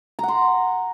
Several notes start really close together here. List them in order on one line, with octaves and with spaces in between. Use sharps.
A#5 F#5 C6